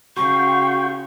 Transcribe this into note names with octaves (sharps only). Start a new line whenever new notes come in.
C#3 F#4 G5 C6 C#6